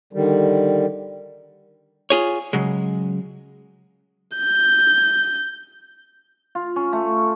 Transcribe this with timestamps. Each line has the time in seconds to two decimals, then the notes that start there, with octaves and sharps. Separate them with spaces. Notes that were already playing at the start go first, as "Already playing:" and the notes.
0.13 D3 D#3 G3
2.10 F4 G#4 C#5
2.53 C#3 F#3 G#3
4.37 G6
6.55 F4
6.76 C#4
6.93 A3